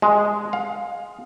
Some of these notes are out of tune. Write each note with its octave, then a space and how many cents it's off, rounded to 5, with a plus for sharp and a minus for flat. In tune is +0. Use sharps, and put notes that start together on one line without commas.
G#3 +0
F5 +20